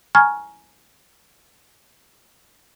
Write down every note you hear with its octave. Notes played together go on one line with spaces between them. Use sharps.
G#5 A#5 C#6 F6 G#6